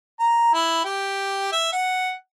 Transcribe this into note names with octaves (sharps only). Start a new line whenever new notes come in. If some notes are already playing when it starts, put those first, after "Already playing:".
A#5
E4
G4
E5
F#5